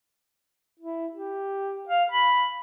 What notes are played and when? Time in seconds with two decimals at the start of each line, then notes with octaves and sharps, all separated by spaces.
0.80 E4
1.12 G4
1.89 F5
2.12 B5